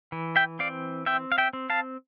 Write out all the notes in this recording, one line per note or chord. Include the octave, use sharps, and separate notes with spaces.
E3
E5 G5
C4 D5 F5
C4 E5 G5
F5
E5 G5
C4
F5 A5